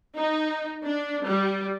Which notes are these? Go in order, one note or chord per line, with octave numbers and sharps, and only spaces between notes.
D#4
D4
G3